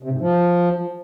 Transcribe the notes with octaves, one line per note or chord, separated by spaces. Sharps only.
C3
G#2
F3